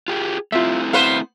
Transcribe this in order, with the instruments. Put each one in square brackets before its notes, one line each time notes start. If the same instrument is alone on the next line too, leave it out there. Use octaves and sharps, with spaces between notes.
[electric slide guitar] F4 G4 G#4
[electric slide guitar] A3 C4 E4 [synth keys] F4 E5
[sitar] B3 B4 C5 [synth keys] F5